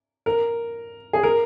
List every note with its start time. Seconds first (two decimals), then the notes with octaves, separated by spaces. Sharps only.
0.26 A#4
1.13 G#4
1.23 A#4